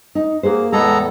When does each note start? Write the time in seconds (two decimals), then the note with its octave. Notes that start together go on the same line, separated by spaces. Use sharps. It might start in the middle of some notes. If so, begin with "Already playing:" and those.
0.15 D#4
0.43 A#3 F#4 G#4 C5
0.72 E2 A2 G#3 B3 A4 A#5